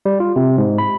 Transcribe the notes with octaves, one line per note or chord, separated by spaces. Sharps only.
G3
F4
C3
G#2
B5